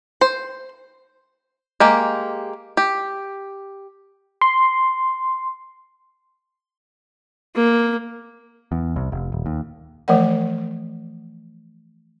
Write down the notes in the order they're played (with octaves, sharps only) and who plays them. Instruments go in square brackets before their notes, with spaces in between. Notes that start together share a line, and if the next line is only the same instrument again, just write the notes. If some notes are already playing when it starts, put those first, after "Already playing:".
[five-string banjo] C5
G#3 A#3 G4
G4
[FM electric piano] C6
[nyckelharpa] A#3
[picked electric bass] E2
C2
F1
D#1
D#2
[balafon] E3 F3 A3 A#4 D5 F#5